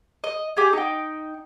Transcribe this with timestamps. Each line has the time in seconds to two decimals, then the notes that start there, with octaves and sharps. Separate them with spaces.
0.24 D#5
0.57 G4 G#4
0.73 D#4 G5